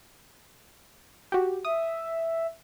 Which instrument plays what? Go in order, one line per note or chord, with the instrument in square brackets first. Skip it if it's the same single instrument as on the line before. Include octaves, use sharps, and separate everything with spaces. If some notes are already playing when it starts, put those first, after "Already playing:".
[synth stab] F#4 G4
[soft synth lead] E5 [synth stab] D#6